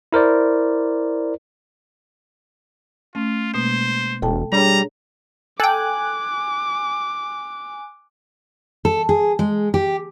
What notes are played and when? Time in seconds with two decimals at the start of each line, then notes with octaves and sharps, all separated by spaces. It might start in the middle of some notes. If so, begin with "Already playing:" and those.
0.13 E4 A#4 C5 D5
3.15 A3 C#4 F4
3.54 B2 G#3 A#3 C5
4.22 E1 A4 G5 A5
4.52 G3 D4 G#4 C#5 A#5
5.60 A4 G5 G#5 D6 F#6
8.85 A4
9.09 G#4
9.39 G#3
9.74 G4